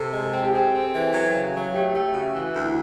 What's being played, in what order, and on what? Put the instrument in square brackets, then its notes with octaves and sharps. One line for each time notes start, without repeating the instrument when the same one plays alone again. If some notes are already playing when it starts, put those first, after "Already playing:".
Already playing: [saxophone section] C3 [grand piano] A4
[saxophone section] G#3
[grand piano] A4
[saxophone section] C4
[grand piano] G4
[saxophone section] C4 [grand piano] G#4
[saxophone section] C4
E3
F#3
C#3
F#3
[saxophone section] A3 [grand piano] G4
[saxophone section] A3 [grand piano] G4
[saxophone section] C#3 [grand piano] F#4
[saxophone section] E3
D2
[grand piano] E4